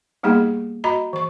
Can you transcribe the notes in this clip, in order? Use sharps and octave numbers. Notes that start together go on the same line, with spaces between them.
G3 A#3 B3 D#4 G4 G#4
F#4 D#5 A#5 B5
E3 C#6